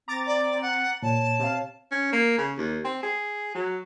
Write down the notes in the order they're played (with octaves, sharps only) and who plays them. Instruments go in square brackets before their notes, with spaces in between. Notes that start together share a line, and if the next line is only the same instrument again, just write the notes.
[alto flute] C4 [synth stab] A#5 D6 A6
[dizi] D5
F#5
[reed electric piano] A#2 [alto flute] C#5 [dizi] A5
[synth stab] C3 F5
[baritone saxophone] C#4
A#3
C#3
D#2
C4
G#4
F#3